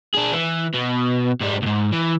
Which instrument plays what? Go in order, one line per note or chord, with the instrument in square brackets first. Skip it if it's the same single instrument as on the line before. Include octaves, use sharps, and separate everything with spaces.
[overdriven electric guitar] D4 G#4
E3
B2
G#2 G3
C#2 G#2
E3